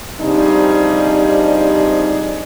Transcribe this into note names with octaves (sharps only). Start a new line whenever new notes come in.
C3 F3 G3 D4 D#4 G#4